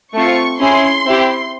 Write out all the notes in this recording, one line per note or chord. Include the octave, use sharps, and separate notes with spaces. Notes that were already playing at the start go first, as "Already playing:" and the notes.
A3 C4 F4 C#6
C#4 E4 G#4 C6
C4 E4 G4